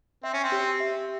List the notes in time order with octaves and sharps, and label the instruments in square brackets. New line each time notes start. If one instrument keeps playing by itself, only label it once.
[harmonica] C4 [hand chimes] E5
[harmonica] C#4
C4
[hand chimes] G4
E5